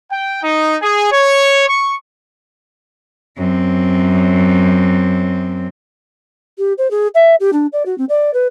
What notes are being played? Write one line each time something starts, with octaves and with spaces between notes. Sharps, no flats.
G5
D#4
G#4
C#5
C#6
F#2 C4
G4
C5
G#4
E5
G4
D4
D5
F#4
C4
D5
B4